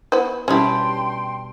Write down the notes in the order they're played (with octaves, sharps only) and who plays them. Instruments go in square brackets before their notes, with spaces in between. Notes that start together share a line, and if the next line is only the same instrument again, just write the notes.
[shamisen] B3 E4 C5
[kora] B2 G3 D4 [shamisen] C#4 E4 [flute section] G5 C6